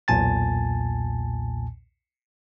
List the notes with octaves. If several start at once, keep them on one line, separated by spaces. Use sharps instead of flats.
B1 E2 A#2 G#5 A5 A6